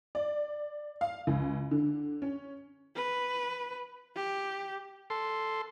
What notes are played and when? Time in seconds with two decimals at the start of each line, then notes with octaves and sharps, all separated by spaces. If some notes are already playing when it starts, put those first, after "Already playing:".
0.15 D5
1.01 F5
1.27 C#2
1.71 D3
2.22 C#4
2.96 B4
4.16 G4
5.10 A4 C6